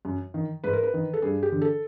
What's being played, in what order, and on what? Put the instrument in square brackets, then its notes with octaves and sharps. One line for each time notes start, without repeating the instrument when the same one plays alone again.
[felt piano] F#2
D#3
G#2 B4
A#4
B4
D#3
A4
G2 G#4
G4
D3
A4